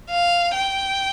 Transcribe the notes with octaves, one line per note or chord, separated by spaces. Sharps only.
F5
G5